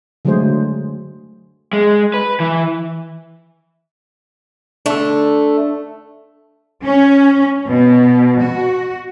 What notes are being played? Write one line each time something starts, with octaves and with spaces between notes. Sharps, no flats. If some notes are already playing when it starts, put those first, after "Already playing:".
D3 F#3 G#3 A3 G#4 C5
G#3
B4
E3
A3 D4 A4
C#4
B2
F#4